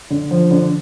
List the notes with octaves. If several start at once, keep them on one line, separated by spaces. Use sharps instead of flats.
D3
F3
D3